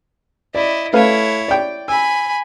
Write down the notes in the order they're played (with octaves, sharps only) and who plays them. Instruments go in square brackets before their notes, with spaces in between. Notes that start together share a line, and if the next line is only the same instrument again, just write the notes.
[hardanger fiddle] E4 D#5 [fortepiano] D5
[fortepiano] A3 B4 F5 [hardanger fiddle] E4 C#5
[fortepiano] D5 G5
[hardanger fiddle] G#5 B5 [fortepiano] E6